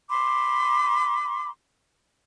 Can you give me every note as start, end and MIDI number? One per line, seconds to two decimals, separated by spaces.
0.09 1.50 83
0.09 1.50 84
0.09 1.50 86